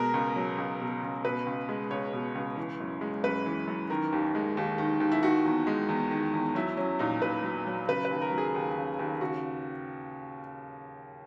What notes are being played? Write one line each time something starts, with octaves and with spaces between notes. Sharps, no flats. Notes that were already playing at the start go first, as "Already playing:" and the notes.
Already playing: B2 G#3 A#4
C#2
F#3
C#2
B2
C#2
B2 B4
C#2
G#3
C#2 C#5
B2
C#2
E3
F#2
G#3
F#2 B4
E3
F#2
D#3 A#4
D#2
G#3
D#2
D#3
D#2
E4
D#3 F#4
E2
G#3
E2
D#3
E2
F#3 E4
F#3 C#4
A#2 D#4
A#2 B4
F#3
F#3
C#3 B4
B4
D#2
A#4
F#3
G#4
D#2
C#3
D#2
C#3 F#4